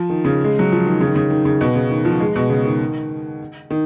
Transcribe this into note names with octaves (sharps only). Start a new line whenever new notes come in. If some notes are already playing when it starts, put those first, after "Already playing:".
Already playing: F3
D#3
C#3
G#3
F#3
F3
D#3
C#3
D#3
C#3
D#3
C#3
B2
C#3
D#3
F3
G#3
B2
C#3
D#3
D#3